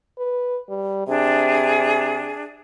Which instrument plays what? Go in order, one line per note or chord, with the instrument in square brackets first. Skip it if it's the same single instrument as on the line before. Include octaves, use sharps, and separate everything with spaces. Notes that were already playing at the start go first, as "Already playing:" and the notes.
[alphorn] B4
G3
[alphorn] C3 [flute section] D4 G#4